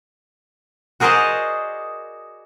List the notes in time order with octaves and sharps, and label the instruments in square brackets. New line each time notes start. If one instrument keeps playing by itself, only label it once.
[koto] F#4 G#4 A#4 C5 D5 D#5